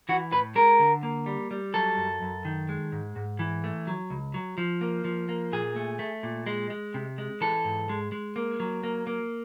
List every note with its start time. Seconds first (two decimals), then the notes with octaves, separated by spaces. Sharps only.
0.09 E3 F#4
0.32 A2 B4
0.55 G#3 A#4
0.79 D3
1.03 A#3
1.26 G3
1.51 G3
1.74 F#3 A4
1.97 F#2
2.22 F#2
2.45 D#3
2.69 G#3
2.92 G#2
3.16 G#2
3.39 E3
3.64 A3
3.87 F#3
4.10 C#2
4.34 F#3
4.58 F3
4.81 A#3
5.05 F3
5.29 A#3
5.53 A#2 G#4
5.76 A3
5.99 A3
6.23 A#2
6.46 G#3
6.70 G#3
6.94 C3
7.18 G#3
7.41 E3 A4
7.65 G#2
7.89 G#3
8.12 G#3
8.36 A#3
8.60 F#3
8.83 A#3
9.07 A#3